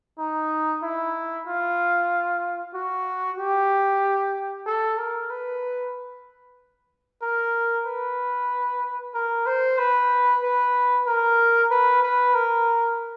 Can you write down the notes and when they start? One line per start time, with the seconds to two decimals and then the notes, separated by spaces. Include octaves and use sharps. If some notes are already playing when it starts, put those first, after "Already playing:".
0.18 D#4
0.83 E4
1.46 F4
2.74 F#4
3.38 G4
4.66 A4
4.98 A#4
5.30 B4
7.22 A#4
7.86 B4
9.14 A#4
9.47 C5
9.78 B4
10.42 B4
11.06 A#4
11.71 B4
12.02 B4
12.34 A#4